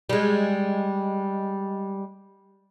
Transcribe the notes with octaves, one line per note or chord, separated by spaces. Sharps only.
G3 G#3